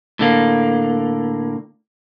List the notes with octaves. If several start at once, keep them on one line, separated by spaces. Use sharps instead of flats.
A2 D3 A#3